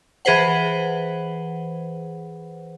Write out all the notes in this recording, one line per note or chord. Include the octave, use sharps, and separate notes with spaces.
E3 G#4 B4 C5 F#5